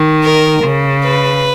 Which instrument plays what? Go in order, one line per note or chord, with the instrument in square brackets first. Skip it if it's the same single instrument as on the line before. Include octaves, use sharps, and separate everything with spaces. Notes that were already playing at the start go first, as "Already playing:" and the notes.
Already playing: [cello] D#3
[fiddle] A#4
[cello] C#3
[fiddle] B4